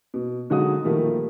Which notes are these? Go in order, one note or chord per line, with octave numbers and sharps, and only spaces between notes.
B2
D3 F#3 G#3 D#4 F#4 D#6
A#2 D#3 F3 G3 A3 A#3